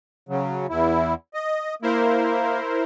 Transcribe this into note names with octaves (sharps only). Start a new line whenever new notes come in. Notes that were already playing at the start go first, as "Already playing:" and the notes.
C#3 F#3
E2 E4
D#5
A#3 E4 A#4 C5